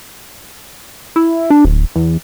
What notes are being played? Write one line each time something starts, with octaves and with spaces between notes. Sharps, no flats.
E4
D4
D1
E2